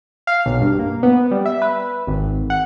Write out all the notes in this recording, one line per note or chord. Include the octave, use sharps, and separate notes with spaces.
F5
B1
G2
A#3
B3
G3
E5
B4
G#1
F#5